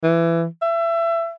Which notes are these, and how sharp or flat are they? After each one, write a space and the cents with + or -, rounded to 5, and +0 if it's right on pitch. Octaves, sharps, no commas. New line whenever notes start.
E3 +20
E5 +25